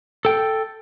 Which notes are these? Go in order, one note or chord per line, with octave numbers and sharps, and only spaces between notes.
A4 G5